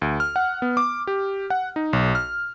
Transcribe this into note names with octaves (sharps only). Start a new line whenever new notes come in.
D2
F6
F#5
B3
D6
G4
F#5
D#4
B1
F6